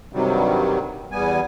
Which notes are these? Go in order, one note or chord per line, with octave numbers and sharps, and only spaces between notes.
G2 C3 D#3 F#3 G3
E2 G3 B3 G#5